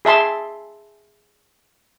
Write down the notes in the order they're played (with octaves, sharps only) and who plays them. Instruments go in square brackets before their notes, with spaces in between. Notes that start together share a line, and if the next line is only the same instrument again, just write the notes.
[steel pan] G#4 E5 A5 C6